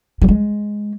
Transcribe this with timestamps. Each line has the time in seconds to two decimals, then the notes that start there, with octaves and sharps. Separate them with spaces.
0.22 F#3
0.28 G#3